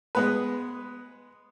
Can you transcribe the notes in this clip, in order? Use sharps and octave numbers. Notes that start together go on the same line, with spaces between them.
G#3 B3 B4